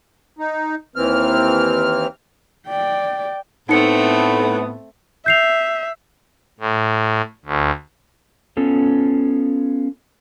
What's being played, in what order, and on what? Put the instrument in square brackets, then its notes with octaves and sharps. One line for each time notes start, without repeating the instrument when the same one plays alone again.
[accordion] D#4
D#2 E3 C4 F6
[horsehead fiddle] D5 G5
[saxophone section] A2 B3 [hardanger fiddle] A3 C4 [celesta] D#4 C#7
[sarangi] E5 [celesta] G6 C7 F7
[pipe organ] A2
D2
[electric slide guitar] B3 C#4 F4 A4